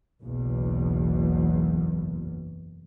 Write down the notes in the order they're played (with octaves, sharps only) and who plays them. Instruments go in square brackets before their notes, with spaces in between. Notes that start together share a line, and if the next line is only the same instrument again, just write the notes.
[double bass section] F#1 B1 E2 B2